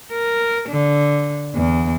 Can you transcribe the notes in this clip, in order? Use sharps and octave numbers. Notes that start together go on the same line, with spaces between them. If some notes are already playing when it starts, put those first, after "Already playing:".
A#4
D3
E2